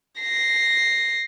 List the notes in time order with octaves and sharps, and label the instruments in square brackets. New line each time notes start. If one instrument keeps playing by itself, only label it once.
[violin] A#6 C7